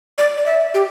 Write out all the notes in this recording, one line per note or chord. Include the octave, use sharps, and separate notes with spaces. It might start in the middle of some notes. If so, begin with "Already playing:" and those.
D5
D5
E5
G4